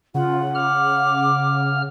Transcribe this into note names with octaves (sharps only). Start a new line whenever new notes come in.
C#3 F4 F#5
D6 F6